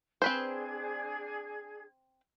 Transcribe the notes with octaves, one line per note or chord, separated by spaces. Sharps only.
C4 D4 G#4 B4 C5 G#6